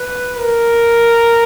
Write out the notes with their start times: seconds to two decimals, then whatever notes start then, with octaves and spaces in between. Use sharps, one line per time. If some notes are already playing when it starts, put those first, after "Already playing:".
Already playing: B4
0.37 A#4